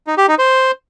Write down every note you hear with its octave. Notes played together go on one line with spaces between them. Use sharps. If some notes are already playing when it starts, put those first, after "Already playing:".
D#4
G4
D#4
C5